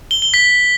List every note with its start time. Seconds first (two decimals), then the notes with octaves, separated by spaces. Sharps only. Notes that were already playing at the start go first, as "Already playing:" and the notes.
0.11 G7
0.22 G7
0.34 B6